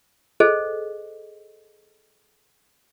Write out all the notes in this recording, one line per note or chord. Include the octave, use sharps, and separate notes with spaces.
G#4 A4 C5 D#5